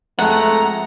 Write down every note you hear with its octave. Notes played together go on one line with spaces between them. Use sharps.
F2 G#3 A3 F#5 A#5